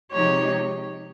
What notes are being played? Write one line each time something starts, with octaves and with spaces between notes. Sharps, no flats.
C3 F3 G#3 D#4 G4 C#5